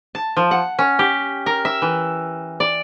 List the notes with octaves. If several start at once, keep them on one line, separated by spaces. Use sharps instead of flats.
A5
F3
F#5
C#4
G4
A#4
E5
E3
D5